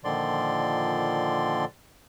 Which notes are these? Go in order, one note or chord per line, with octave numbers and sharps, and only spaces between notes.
A#2 D3 D#3 F3 D5 C6